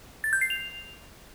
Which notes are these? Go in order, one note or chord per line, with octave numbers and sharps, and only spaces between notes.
A6
G6
C7
F7